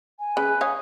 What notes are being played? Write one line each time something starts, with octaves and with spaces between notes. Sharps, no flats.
G#5
C#3 B4
C#5 D#5 F5